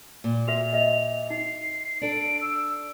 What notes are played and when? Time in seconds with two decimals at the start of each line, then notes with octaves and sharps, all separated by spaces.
0.24 A#2
0.48 F#4 B4 E5 F7
0.73 D#5 E5
1.30 D#4 C7
2.01 D4 A4 D7
2.41 E6